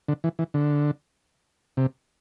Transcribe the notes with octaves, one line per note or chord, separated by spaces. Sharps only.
D3
E3
E3
D3
C3